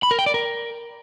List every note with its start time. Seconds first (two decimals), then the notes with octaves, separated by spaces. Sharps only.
0.03 B5
0.11 A#4
0.19 G5
0.26 D5
0.34 A#4